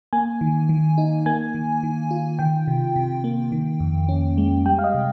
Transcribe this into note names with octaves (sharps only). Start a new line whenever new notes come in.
A#3 G#5
D#3
D#3
D#4
A#3 G#5
D#3
D#3
F4
D#3 G5
C3
C3
A#3
D#3
F2
C#4
G#3
G3 G5
F5
D#5
C3